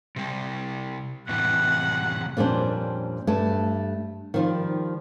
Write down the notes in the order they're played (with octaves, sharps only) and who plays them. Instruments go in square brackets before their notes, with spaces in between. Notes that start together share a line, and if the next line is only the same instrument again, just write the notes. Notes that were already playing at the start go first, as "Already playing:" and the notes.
[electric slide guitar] C3 G3
[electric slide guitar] A2 C3 E3 [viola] F#5
[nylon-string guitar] F2 A#2 G3 C#4 D4 C5
G2 A3 A5
D#3 F3 G3